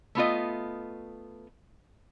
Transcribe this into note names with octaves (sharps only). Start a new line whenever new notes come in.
A3 B3 F4 D#5